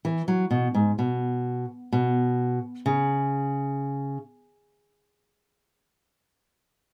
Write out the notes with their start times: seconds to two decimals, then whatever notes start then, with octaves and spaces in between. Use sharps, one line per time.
0.05 E3
0.28 F#3
0.51 B2
0.74 G#2
0.99 B2
1.92 B2
2.86 C#3